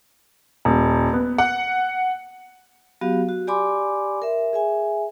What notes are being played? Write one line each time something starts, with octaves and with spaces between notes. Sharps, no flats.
D#1
B3
F#5
F#3 B3 F#4 G4 F5
F#4
G4 D5 G#5 B5 C6 D6
A#4 E5
G#4 E5 G#5